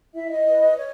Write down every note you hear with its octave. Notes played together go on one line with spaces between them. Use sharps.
E4 E5
D#5
E4 B4
C#5